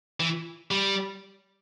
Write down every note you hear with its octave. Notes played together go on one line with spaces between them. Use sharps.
E3
G3